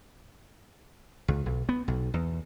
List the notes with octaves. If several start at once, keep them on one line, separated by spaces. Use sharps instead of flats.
C#2
B1
B3
B1
E2